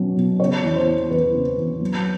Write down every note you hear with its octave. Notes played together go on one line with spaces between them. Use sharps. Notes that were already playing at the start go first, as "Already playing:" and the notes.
Already playing: B2 F#3 C#4
B2
C#3 C#5
E2
C5
E3
E2 B4
C#3
E2
F#3